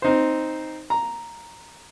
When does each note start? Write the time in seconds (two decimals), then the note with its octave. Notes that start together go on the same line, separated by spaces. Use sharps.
0.02 C4 D#4 C5
0.90 A#5